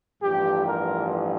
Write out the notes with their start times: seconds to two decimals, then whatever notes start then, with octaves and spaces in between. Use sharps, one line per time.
0.22 A1 G2 F3 G4
0.66 A#4